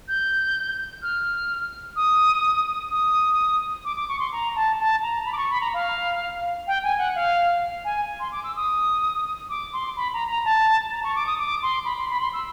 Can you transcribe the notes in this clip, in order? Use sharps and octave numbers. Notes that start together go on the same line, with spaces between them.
G6
F6
D#6
D#6
D6
D6
C#6
C6
A#5
A5
A5
A#5
B5
D6
C#6
B5
A#5
F5
G5
G#5
F#5
F5
G#5
C6
D6
E6
D#6
D6
C6
B5
A#5
A#5
A5
A#5
C#6
D6
D#6
D6
C6
B5
C6
B5
C6
E6